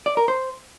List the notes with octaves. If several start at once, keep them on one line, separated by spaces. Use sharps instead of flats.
D5
A#4
C5